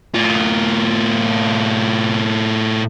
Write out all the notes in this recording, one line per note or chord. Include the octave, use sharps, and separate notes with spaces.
A2 F4